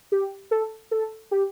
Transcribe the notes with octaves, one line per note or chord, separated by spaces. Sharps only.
G4
A4
A4
G4